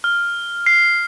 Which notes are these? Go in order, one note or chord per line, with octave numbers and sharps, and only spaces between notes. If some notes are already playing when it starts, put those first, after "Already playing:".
F6
C7